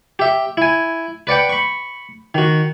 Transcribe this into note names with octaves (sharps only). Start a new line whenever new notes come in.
G4 E5
E4 G#5
B4 D5 F#5 G5
B5 C#6
D#3 F#4